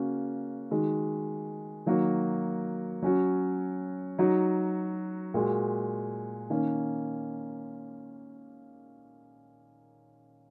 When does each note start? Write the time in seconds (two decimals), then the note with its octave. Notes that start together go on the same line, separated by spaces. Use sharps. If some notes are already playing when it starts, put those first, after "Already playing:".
Already playing: C#3 A#3 C#4 F#4
0.71 D#3 G#3 F#4
1.86 D#3 F#3 A#3 F#4
3.02 F#3 C#4 F#4
4.19 F#3 D#4 F#4
5.34 A#2 G#3 F#4
6.50 D#3 A#3 C#4